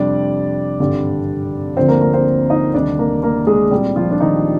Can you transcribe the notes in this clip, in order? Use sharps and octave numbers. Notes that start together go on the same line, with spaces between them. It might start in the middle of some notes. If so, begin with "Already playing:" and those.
Already playing: F2 C3 G3 D4 D5
G#1 G2 D3 G3
D2 D3 F3 C4 C5
A#3 A#4
A#3 A#4
C4 C5
D#4 D#5
D2 C3 D#3 G3 D4 D5
A#3 A#4
A#3 A#4
G#3 G#4
C2 A#2 G3 G4
F3 F4
D4
D#3 D#4